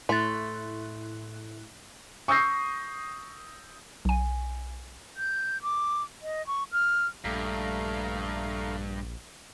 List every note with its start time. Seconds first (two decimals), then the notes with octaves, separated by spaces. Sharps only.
0.09 A2 A3 E4 C6 F#6 A6
2.28 C#6 D#6 E6 G6 A#6 C7
4.05 B1 G#5
5.17 G6
5.62 D6
6.22 D#5
6.47 C#6
6.72 F6
7.25 A#1 G2 A3 F5 A#5